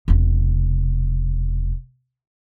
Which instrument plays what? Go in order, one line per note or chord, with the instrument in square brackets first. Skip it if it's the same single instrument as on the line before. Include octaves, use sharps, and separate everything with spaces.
[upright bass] E1 C3